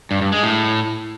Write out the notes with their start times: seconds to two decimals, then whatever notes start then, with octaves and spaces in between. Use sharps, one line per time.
0.11 G2
0.21 G2
0.32 G#3
0.43 A2